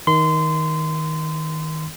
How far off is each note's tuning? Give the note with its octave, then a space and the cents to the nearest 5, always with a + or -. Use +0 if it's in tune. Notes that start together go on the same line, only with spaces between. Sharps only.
D#3 +20 C6 -25